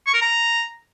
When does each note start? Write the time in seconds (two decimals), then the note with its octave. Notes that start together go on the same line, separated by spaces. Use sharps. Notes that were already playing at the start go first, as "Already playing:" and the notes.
0.07 C#6
0.14 A#4
0.21 A#5